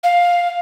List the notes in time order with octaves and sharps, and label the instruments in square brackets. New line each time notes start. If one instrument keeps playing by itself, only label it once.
[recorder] F5